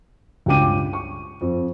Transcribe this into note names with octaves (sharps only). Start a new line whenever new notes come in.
C#2 G2 C#4 G5 D6 D#7
C#6
F2